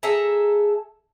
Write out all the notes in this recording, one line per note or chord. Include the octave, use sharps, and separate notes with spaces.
G#4 A4 E5 A#5